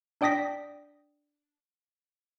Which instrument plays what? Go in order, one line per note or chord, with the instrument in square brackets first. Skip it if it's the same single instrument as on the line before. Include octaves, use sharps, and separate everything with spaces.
[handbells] D4 D5 G5 D#6 A#6 B6